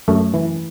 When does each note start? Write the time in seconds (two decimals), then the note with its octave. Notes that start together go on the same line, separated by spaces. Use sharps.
0.08 F#2 A3
0.34 E3